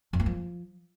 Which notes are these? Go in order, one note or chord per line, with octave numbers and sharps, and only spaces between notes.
F2
A#3
F3